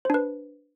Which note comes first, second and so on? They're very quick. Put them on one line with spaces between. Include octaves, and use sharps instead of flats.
C5 D4 B4